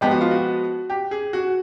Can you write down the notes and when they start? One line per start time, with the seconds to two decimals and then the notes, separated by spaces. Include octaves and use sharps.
0.01 F3 G#3 B3 G4
0.11 F#4
0.21 F4
0.31 F#4
0.90 G4
1.11 G#4
1.33 F#4